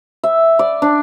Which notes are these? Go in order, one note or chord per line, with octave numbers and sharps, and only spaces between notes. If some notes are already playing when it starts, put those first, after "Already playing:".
E5
D5
D4